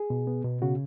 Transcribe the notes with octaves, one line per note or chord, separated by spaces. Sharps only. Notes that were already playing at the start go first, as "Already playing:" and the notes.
Already playing: G#4
B2
B3
B2
C#3 F#4